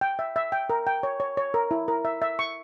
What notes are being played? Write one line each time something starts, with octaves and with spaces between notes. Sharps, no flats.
G5
E5
E5
G5
A#4
G5
C#5
C#5
C#5
A#4
E4
A#4
E5
E5
C#6